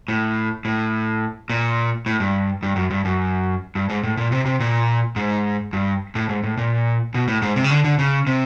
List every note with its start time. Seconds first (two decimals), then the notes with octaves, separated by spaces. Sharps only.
0.08 A2
0.65 A2
1.50 A#2
2.06 A2
2.20 G2
2.63 G2
2.76 F#2
2.91 G2
3.05 F#2
3.75 G2
3.90 G#2
4.03 A2
4.17 A#2
4.32 C3
4.46 C3
4.60 A#2
5.16 G#2
5.73 G2
6.15 A2
6.29 G#2
6.43 A2
6.57 A#2
7.14 B2
7.28 A2
7.42 G#2
7.56 C3
7.64 C#3
7.70 D3
7.85 D3
7.99 C#3
8.27 C3